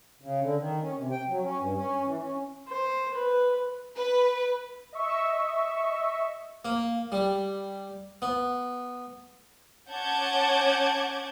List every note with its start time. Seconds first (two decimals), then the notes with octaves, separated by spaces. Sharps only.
0.22 C#3
0.41 D3
0.59 D#3
0.81 C#4
0.97 C3
1.11 G5
1.28 F#3
1.42 C#4
1.59 G2
1.75 C#4
2.05 E3
2.20 C#4
2.68 C5
3.15 B4
3.95 B4
4.93 D#5 E5 C#6 E6
6.65 A#3
7.12 G3
8.22 B3
9.92 C#4 F#5 A5 D6 G6 G#6